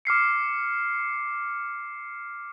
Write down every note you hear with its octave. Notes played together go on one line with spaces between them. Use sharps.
D6 F6 C7 C#7